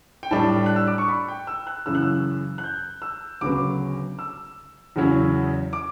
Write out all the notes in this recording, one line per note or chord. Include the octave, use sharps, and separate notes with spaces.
G5
A2 G3 D4 A5
F#6
E6
D6
C#6
B5
G5
E6
F#6
F#2 C#3 E3 E6
F#6
E6
F#6
G6
E6
D2 C#3 F#3 B3 D6
E6
E2 C#3 F#3 C#4 E4
D6